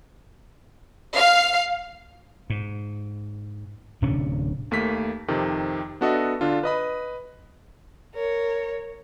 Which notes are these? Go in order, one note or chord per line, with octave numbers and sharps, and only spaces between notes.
F5
G#2
D1 C3 C#4 D4
D#2 A3 A#3 B6
F2 C3 D#3
B3 D4 F#4 A4 D#5 E5
D3 D4 F4
B4 D#5 B5
A#4 C#5